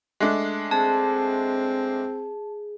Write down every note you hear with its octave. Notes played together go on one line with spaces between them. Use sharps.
G#3 A3 D4
C4 G#4 A5